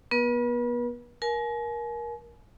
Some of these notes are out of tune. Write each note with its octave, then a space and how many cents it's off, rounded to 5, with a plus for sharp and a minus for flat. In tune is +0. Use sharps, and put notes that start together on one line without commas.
B3 -30 B4 -40
A#4 +20 G#5 +40